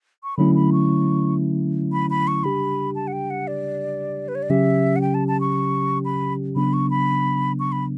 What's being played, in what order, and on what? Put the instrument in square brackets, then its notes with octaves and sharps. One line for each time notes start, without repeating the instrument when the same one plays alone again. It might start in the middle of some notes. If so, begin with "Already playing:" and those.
[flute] C#6
[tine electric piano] D3 F#3 A3 C#4 E4 [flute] B5
[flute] B5
C#6
B5
B5
C#6
[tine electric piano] C#3 G3 D4 G4 [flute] B5
[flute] A5
F#5
G5
F#5
D5
B4
C#5
D5
[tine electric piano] C#3 F#3 C#4 G4 [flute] E5
[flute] F#5
G5
A5
A5
C#6
B5
[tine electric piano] C#3 F#3 B3 D4 [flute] B5
[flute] C#6
B5
C#6
B5